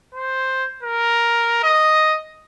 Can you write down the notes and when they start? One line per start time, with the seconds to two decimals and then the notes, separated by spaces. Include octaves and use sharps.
0.14 C5
0.83 A#4
1.63 D#5